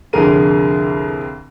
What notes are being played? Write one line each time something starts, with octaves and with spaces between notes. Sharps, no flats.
C2 F2 D3 G#4 A#4 D#7